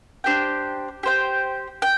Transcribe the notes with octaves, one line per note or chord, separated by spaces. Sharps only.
D4 G4 C5 G5
G4 C5 G5
G5